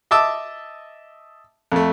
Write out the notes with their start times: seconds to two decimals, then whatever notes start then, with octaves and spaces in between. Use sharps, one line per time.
0.11 D#5 E5 A5 D6 E6
1.72 F2 A3